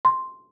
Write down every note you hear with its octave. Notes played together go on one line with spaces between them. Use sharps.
C6